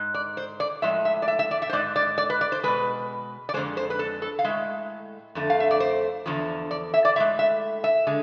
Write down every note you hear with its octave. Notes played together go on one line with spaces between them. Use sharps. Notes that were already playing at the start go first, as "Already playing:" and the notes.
Already playing: G#2 G#3
D5
C5
D5
A2 F3 G#3 E5
E5
D5
E5
E5
D5
E5
C5
G#2 G#3 D5
D5
D5
B4
D5
C5
B2 G#3 B4
D5
F2 D3 G#3 C5
C5
B4
A4
A4
F5
A2 G#3 E5
F2 D3 A3
F5
E5
D5
C5
E2 D3 F3
D5
E5
D5
A2 G#3 E5
E5
E5
D3 G#3